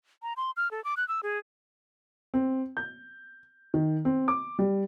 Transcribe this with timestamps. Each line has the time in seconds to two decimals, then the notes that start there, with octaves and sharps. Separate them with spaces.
0.23 A#5
0.37 C6
0.57 F6
0.71 A4
0.84 D6
0.97 F#6
1.08 E6
1.23 G#4
2.34 C4
2.77 G6
3.74 D#3
4.05 C4
4.28 D6
4.59 G3